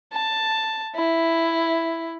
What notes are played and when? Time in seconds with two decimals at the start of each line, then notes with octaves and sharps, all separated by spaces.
0.12 A5
0.95 E4